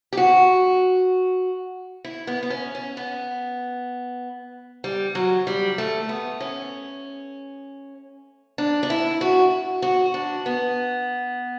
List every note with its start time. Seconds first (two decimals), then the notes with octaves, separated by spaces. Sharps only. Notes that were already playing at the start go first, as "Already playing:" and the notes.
0.13 G4
0.17 F#4
2.04 E4
2.27 B3
2.43 B3
2.50 C#4
2.75 C#4
2.97 B3
4.84 G3
5.15 F#3
5.47 G3
5.78 A3
6.09 B3
6.40 C#4
8.58 D4
8.83 D4
8.90 E4
9.21 F#4
9.82 F#4
10.14 D4
10.46 B3